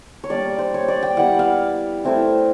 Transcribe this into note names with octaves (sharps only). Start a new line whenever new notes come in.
C#5
G3 A#3 D4 D5
C5
C#5
D5
G5
G3 B3 E4 F#5
F5
A3 C4 E4